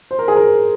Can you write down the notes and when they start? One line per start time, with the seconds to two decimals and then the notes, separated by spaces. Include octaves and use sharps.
0.11 C5
0.19 A#4
0.28 G#4
0.36 A#4